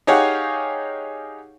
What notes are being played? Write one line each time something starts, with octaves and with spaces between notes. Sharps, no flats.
D#4 G4 G#4 C#5 F5 F#5